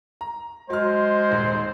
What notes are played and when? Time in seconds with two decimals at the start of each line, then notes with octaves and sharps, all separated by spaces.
0.21 A#5
0.70 F#3 G#3 C5 F6
1.30 D#1 G#2